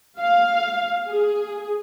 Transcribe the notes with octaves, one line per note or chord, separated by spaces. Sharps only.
F5
G#4